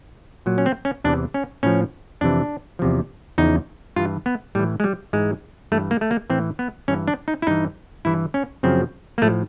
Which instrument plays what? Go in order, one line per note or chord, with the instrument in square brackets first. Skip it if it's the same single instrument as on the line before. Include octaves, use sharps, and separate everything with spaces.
[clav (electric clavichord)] A#2 F#3
C#4
C4
C#4
E2 C3 E3 D4
C#4
A2 F3 C#4
F2 C3 E3 D4
E2 C3 F3
E2 C#3 F3 D#4
G2 E3 F4
B3
A2 G3
E3
G#3
G3
G#2 E3 G#3
G2 E3 A3
A#3
A3
A#3
A2 E3 C4
B3
G2 E3 C#4
D4
D#4
E4
G2 E3 D#4
G2 E3 E4
C#4
F#2 C#3 F3 C4
A#3
A2 F3 A3